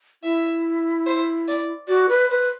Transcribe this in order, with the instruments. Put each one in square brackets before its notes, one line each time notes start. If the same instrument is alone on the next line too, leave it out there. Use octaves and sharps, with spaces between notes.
[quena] E4 [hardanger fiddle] E5
[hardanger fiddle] C5
D5
[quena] F#4 [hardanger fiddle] D5
[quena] B4
[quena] B4 [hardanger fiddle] C5